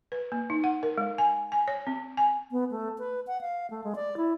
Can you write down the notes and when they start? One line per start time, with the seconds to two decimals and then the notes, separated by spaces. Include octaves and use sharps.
0.12 B4
0.32 A#3
0.50 D#4
0.64 F#5
0.83 A#4
0.98 G#3
1.18 G#5
1.52 G#5
1.68 C#5
1.87 C4
2.17 G#5
2.51 B3
2.71 A3
2.99 B4
3.27 F#5
3.41 F5
3.71 A3
3.84 G#3
3.96 D5
4.17 E4